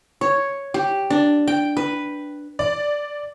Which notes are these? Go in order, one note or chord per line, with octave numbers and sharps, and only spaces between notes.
C#5
G4
D4
G5
B4
D5